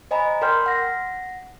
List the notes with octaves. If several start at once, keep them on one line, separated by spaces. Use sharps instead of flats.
C5 D#5 G#5 A#5 B5
A#4 D5 G5 C6 F6 G6
F#5 A#6